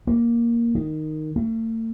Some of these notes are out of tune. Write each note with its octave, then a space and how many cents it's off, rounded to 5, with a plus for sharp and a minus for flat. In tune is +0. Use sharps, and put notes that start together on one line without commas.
A#3 +5
D#3 -5
A3 +45